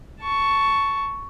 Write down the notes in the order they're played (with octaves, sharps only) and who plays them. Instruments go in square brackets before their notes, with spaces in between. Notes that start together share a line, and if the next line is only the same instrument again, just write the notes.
[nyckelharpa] A5 C#6